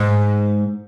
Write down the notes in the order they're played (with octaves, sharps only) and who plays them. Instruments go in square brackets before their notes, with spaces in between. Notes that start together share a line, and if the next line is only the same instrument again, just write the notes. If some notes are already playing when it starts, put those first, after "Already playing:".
Already playing: [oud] G#2